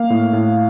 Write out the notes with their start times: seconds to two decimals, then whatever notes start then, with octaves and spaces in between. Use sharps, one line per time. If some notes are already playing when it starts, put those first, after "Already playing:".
Already playing: A#3 F5
0.10 A2
0.33 A2